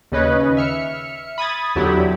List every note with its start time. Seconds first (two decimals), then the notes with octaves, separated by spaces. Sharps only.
0.12 D#2 C#3 C#4 B4 D#5
0.57 E5 F6 C#7
1.38 B5 D#6 G#6 A6
1.75 E2 D3 F#3 E4 G4 B5